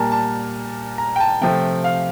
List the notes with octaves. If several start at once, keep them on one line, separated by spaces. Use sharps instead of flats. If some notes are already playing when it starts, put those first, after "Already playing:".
Already playing: A#2 G3 A#3 A5 A#5
A5
A#5
G5
A5
C3 F3 A3 G5
F5